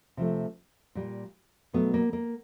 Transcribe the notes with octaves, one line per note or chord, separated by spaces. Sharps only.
C3 F3 A3
A#2 G3
B2 F#3 A3 B3
A#3
A#3